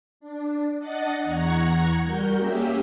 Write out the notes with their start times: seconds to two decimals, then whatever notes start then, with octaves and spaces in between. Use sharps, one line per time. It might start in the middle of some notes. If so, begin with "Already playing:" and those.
0.20 D4
0.78 D4 D#5 F#5 A6
1.24 E2 F#5 A#5 C#6 G#6
2.03 G3 F#4 A#4 G6
2.37 A#3 C#4 G4 G#4 E5